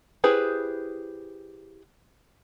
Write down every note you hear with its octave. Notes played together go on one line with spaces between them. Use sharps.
E4 G4 G#4 B4 C5